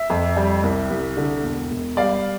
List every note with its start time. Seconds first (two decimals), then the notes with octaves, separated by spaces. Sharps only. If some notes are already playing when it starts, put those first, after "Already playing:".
Already playing: E5
0.10 F2
0.36 G3
0.63 C2
0.90 C2
1.17 D3
1.44 E1
1.71 E1
1.97 G3 D5 F5